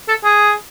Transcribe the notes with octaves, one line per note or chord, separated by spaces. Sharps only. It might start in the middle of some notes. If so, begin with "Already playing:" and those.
A4
G#4